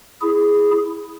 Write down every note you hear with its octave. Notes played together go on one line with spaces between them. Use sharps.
E4 G#4